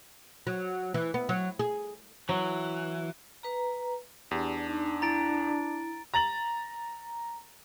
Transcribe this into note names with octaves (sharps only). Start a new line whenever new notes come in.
F#3
E3
B3
F#3
G#4
E3 F#3
B4 A#5
E2 D4 G4
D4 D#4
E4 A#5 A6 D7
A#5 A6 F#7